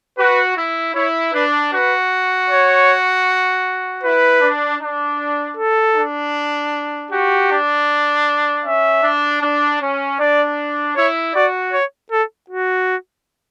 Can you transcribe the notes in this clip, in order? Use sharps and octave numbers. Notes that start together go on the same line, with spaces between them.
F#4 B4
E4
E4 C#5
D4 B4
F#4 B4
C#5
E4 B4
D4
D4
A4
D4
F#4 G4
D4
C#4 E5
D4
D4
C#4
D4 D5
E4 C#5
F#4 D5
C#5
A4
F#4